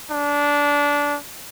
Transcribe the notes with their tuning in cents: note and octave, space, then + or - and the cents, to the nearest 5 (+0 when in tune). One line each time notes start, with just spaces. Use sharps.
D4 -20